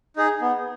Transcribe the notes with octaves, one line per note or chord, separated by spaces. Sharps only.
D#4 G#4
B3